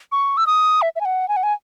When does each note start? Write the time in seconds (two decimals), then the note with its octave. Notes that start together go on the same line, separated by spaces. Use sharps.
0.12 C#6
0.37 E6
0.47 D#6
0.82 E5
0.96 E5
1.01 G#5
1.05 F#5
1.28 G#5
1.36 F#5
1.43 G#5